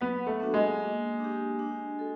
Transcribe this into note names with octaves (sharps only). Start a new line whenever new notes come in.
F#3 B3
A3
B3 D4 F#4
G#3
A#3
D4 G4
D4
F#4 A4